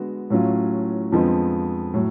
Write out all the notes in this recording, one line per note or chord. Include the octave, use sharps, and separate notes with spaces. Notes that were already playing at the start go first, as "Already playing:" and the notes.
Already playing: D3 G#3 B3 F#4
A2 F#3 C#4 F4
F2 D3 F3 G#3 B3
A2 F#3